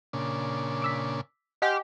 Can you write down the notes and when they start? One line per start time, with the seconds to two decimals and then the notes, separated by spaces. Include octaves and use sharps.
0.13 A#2 C#3 D4
0.82 D6 E6 B6
1.62 G4 D#5 F#5 G#5 C6 F6